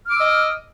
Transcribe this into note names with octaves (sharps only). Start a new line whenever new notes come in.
D#5 D6 E6 F6